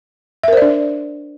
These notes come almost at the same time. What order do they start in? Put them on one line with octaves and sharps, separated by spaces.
E5 A#4 C5 D5 D4